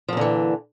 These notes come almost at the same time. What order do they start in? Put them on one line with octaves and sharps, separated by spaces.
F3 A#2 D3 E3